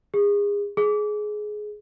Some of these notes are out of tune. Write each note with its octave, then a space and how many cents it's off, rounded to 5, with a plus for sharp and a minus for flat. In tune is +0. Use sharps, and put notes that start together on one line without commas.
G#4 -30
G#4 +20